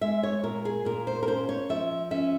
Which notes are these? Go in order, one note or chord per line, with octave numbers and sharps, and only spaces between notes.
G#3 E5
C#5
A#2 A#4
G#4
A#2 A#4
C5
A#4
C#4 C5
C#5
F3 E5
C#4 E5